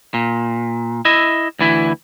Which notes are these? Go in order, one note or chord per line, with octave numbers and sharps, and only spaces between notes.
A#2
E4 D#5 E5
D2 E3 E4